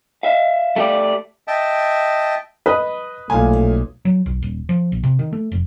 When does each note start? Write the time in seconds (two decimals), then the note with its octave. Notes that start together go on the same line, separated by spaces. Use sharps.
0.23 E5 F5
0.76 A3 G4 D5
1.48 D#5 E5 G5 A5
2.66 B4 D#5 D#6
3.30 B1 A#2 A3 F5 G#5
4.05 F#3
4.26 B1
4.42 D#1
4.69 F3
4.92 A#1
5.03 C3
5.19 D#3
5.33 A3
5.52 F1